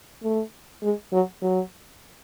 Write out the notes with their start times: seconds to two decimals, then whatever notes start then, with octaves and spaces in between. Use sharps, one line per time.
0.24 A3
0.83 G#3
1.13 F#3
1.42 F#3